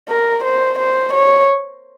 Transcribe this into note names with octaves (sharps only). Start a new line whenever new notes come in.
A#4
C5
C5
C#5